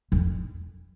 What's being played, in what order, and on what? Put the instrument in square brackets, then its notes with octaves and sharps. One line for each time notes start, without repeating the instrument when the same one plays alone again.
[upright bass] F2